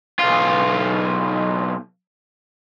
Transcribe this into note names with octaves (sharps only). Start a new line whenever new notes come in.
B1 F4